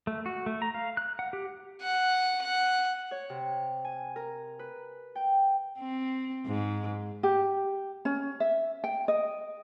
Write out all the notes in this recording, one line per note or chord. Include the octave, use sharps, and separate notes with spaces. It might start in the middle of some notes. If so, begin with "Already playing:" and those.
A3
F#4
A3
A#5
F5
F#6
F#5
G4
F#5
F#5
C#5
C3
G#5
A#4
B4
G5
C4
G#2
G4
C#4
E5
G5
D#5